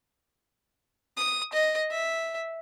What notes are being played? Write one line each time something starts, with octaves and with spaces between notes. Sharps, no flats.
D#6
D#5
E5